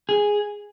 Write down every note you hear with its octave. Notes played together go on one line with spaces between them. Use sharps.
G#4